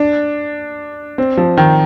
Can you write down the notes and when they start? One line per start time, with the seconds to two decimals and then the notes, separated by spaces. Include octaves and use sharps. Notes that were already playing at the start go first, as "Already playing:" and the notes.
Already playing: D4
1.18 C4
1.37 F3
1.57 D#3